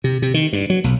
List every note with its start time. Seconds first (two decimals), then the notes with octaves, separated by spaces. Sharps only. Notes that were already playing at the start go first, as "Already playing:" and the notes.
0.04 C3
0.22 C3
0.34 D#3
0.53 G2
0.70 F#3
0.84 B1